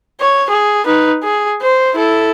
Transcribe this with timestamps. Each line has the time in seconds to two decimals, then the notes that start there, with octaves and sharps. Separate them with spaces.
0.20 C#5
0.50 G#4
0.85 D#4 B4
1.24 G#4
1.62 C5
1.94 E4 A4